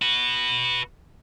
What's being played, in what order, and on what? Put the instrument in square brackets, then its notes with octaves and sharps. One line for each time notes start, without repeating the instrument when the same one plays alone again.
[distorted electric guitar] F#4 B4